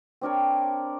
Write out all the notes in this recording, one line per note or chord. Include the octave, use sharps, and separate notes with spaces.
C4 D4 A#4 C#5